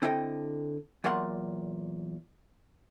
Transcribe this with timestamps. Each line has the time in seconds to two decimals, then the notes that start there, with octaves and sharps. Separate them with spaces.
0.02 D3 C4 E4 A4 D#5 G5
1.04 E2 A#2 F#3 A#4 F#5 C6